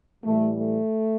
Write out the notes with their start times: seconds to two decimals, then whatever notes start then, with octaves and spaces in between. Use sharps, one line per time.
0.23 A2 E3 G3 A3
0.59 A3